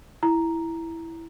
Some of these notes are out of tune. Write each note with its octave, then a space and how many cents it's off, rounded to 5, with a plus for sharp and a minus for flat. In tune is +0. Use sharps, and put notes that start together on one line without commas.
E4 +0 A#5 +0